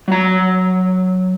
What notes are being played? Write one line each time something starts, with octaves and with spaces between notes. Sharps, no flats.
F#3 A#5